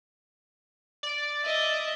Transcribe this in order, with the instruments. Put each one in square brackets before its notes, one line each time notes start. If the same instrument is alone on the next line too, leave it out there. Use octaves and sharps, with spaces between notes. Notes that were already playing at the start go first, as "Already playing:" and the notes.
[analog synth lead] D5
[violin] D#5 E5